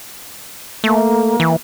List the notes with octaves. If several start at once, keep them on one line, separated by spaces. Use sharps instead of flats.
A3 A#3
E3